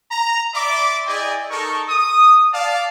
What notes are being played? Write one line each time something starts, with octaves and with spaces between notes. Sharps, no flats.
A#5
D5 E5 B5 C6 D6
E4 G#4 D5 D#5 G5 G#5
D#4 A4 A#4 C#6
D#6
D5 F5 A5